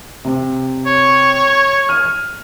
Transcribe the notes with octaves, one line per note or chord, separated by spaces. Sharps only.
C3
C#5
F6 D#7